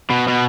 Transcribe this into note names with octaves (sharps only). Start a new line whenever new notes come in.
B2
B2